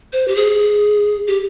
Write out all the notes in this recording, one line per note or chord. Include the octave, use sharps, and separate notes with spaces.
C5
G4
G#4
G4